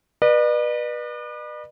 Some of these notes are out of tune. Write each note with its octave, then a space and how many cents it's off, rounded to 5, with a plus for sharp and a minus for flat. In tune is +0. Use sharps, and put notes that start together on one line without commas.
B4 -25 D5 +45